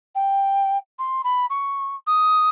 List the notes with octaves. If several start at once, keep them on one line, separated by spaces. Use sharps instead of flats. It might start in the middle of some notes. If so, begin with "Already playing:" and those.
G5
C6
B5
C#6
D#6